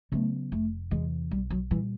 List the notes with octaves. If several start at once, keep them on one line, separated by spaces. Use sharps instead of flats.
C#3 F#3 A3 B3
F1 A3
E2 C3 E3 G#3
B1 G3
F#3
A#2 E3 G3